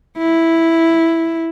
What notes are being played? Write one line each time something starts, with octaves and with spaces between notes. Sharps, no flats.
E4